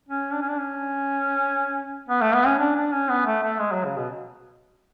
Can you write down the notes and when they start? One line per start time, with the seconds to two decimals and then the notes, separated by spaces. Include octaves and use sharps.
0.09 C#4
0.33 D4
0.42 C#4
0.49 D4
0.59 C#4
2.09 B3
2.22 A3
2.34 B3
2.47 C#4
2.59 D4
2.76 D4
2.93 C#4
3.09 B3
3.26 A3
3.43 A3
3.59 G#3
3.72 F#3
3.85 C#3
3.97 B2